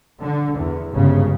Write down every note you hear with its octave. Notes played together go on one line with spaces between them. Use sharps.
D3
E2
G1 G#2 C#3